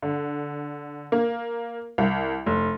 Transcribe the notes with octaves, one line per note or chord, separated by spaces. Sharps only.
D3
A#3
C2
F1